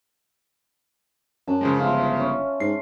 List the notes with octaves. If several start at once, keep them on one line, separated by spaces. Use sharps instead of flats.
F#2 A5
C#3 F3 G#3
G1 F4 E5
C#4
G#2 C7